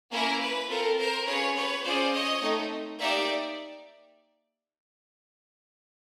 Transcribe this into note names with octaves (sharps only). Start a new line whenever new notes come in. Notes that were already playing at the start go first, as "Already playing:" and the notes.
A#3 C#4 E4 A#4
B4
C4 F4 A4 A#4
A#4 C5
C#4 F4 G#4 B4 C#5
B4 C#5
C#4 F4 G#4 C5 D5
C#5 D#5
A3 C4 D#4
A#3 D#4 G4 D5 E5